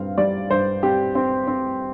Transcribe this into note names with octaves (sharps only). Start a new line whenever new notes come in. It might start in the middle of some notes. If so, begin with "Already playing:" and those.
Already playing: G2 C4 F5
G3 D5
G2 C5
C4 G4
C4
C4